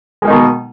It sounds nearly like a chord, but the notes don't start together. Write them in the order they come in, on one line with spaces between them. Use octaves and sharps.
G#3 A#3 D#4 B2 D#3